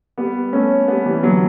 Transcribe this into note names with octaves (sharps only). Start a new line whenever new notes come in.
G3 B3
A3 C#4
G3 B3
E3 G3
D3 F#3